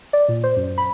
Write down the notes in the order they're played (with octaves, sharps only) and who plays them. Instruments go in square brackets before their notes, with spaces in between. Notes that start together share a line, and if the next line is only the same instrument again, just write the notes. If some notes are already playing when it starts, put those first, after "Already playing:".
[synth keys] D5
A#2
C5
F#2
B5